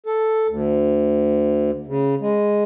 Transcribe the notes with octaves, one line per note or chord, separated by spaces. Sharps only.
A4
D2
C#3
G#3